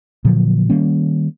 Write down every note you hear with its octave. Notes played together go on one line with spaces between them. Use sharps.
A#2 D3 F3 F#3
D#3 G3 A#3 C#4